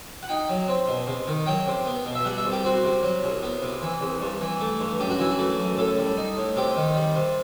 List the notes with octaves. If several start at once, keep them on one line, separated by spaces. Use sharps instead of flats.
F#5
D#4 G5
F#3
C4
B2
C3
D#3
F#3 G5
C3
B3
B2
E5
G3 F#5
E5
C2
G4
C4 F#4
C3
F#3
C2
B3
C3
E3
C2
G2
E3
A3
G2
F#2 G4
F#4
E3 E4
F#4
A3
F#2
A2 A4
G3
D#4
A2
C3 G4
D#3
G3
C3